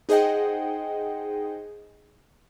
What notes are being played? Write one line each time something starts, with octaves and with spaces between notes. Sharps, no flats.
D#4 G#4 C5 D#5 F#5 G5